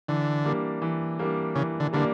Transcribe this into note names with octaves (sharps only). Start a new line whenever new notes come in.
D3 E3
G3 A#3 D4
E3
G3 A#3 D4
C#3 E3
D3
D3 G3 A#3 D4